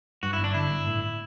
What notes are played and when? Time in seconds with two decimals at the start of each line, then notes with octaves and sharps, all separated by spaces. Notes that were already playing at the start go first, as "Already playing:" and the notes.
0.23 G2 F#4
0.33 E4
0.38 G1
0.44 D4
0.54 D3 E4
0.70 G1
0.87 A2